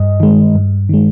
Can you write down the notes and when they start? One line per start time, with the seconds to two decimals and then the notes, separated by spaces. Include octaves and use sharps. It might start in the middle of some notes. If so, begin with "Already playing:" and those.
Already playing: G2 D#5
0.20 D#3 G#3
0.55 G2
0.89 D#3 G#3